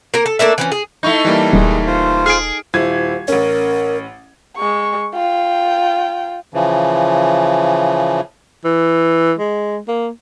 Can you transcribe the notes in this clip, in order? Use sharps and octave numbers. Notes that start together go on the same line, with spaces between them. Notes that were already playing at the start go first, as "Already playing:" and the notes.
A#3 A#4
A4
A3 A#3 D4 E5
E3 F3 C#4
G#4
A3 D#4 E4 C#6 G6
E3 G3 A#3
D#1 G#3
F4 C5
G#4 F6 D7
D#1 E4 C5 G#6
A1 C#4 A#4
G#3 C#6
F4 G5
C#3 E3 F3
E3
G#3
A#3